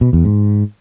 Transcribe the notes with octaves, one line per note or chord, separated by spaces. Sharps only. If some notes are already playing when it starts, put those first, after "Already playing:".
B2
E2
G#2